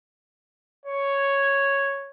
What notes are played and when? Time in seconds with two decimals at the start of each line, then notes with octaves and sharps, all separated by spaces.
0.86 C#5